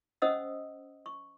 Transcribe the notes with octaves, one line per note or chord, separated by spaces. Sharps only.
C#4 C5 D#5 F#5 D#6 E6
C#6